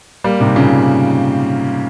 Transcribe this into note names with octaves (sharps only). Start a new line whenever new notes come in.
G3 A#3
G#2 C3
A#2 C#3